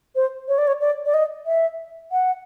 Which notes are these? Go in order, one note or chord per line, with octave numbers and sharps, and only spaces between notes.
C5
C#5
D5
C#5
D5
D5
D#5
E5
F#5